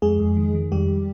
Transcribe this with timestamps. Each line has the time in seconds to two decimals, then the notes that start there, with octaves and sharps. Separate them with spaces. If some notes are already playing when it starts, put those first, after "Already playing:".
0.02 F2 G#3 G#4
0.19 F2
0.37 D#3
0.55 D#3
0.72 F2 G3 G4